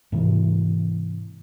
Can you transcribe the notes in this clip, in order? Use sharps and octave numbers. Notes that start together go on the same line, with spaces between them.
G#2 C3 E3 A#3